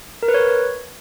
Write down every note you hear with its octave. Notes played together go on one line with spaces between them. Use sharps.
A#4
B4
C#5